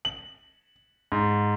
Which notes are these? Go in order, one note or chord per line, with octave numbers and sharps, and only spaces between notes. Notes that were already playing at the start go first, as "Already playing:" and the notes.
F#7
G#2